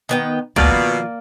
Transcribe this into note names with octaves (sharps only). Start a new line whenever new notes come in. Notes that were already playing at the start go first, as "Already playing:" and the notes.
D#3 B3 G5
A1 D2 B2 A#3 F4 D5
D#3 F3